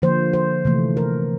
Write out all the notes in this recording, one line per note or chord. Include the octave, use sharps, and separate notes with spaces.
D3 F3 A#3 C5
C5
C3 E3 A3
A#4